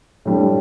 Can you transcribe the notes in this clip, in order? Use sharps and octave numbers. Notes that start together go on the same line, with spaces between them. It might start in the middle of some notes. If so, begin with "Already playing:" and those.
A2 G3 D4